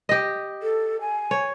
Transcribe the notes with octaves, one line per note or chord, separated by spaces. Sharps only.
G4 D#5
A4
G#5
C#5